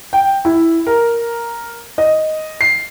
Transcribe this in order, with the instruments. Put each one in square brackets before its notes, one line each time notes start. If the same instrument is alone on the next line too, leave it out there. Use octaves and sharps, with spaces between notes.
[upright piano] G5
E4
A#4
D#5
C7